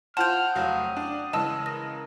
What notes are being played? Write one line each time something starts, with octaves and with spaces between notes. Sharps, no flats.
F4 C5 F#5 G5 A5 F6
F1 F#3 F5 D#6
D4 D5
C#3 E3 G#3 D#5 A5 E6
A#4 A#6